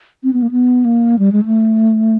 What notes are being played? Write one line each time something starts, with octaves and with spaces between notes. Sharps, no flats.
C4
B3
A#3
B3
A#3
G3
G#3
A3